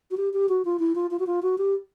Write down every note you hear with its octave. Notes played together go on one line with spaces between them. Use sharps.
F#4
G4
G4
F#4
F4
E4
F4
F4
F#4
F4
F#4
G4